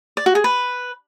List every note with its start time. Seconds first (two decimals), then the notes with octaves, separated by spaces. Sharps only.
0.17 D5
0.26 F#4
0.35 G#4
0.44 B4